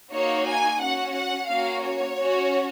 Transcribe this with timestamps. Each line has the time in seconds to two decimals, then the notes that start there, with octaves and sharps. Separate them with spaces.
0.12 A#3 D#4 F#4 C#5
0.46 G#5
0.79 C#4 F#4 F#5
1.14 F#5
1.47 A#3 C#4 F#4 F5
1.82 C#5
2.16 C#4 F#4